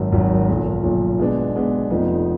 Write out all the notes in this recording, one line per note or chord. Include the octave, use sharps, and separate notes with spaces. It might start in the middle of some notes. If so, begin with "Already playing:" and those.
Already playing: G#1 F#2 D#3 F#3
G#1 F#2 D#3 F#3
B1 A#2 F3
B1 A#2 F3
B2 G#3 B3 D4
B2 G#3 B3 D4
F1 F2 F3 B3 D#4